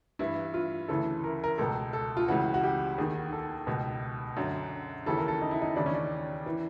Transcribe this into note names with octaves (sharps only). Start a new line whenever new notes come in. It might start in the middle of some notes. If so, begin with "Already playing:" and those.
G2 E3 E4
F4
D2 C#3 E3 A4
A#4
A#4
C#2 B2 A4
A4
F4
C#2 C#3 E3 F#4
F#4
G4
D#2 D#3 G#4
A4
C#2 B2
F#2 D3
D#2 C#3 E3 A4
A#4
A4
D#4
E4
D#4
D#2 C#3 E3 D4
C#4
D4
E3